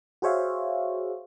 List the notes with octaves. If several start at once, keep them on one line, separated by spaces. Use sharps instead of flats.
F#4 G#4 C5 C#5 E5 F5